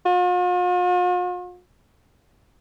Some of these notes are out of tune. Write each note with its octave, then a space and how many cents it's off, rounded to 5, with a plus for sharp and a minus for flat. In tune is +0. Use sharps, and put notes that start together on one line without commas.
F4 +45